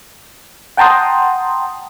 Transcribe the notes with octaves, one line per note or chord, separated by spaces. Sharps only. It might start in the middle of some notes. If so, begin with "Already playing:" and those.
F#5 G5 A5 A#5 C6 D#6